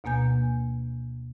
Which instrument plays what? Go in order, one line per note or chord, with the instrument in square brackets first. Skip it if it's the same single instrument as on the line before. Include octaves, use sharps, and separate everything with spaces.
[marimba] D2 B2 A#3 G#5 G6